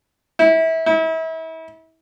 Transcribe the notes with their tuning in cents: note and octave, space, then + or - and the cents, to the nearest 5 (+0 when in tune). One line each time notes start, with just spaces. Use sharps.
E4 -25
E4 -35